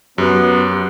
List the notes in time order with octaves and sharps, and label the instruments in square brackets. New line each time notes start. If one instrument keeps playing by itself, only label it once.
[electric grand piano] F#2 [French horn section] F#3 [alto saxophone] B3 [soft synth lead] G4